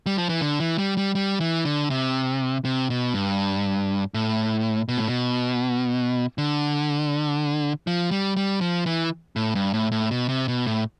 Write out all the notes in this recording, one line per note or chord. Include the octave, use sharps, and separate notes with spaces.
G3
F3
E3
D3
E3
G3
G3
G3
E3
D3
C3
C3
B2
G2
A2
B2
A2
B2
D3
F3
G3
G3
F3
E3
A2
G2
A2
A2
B2
C3
B2
A2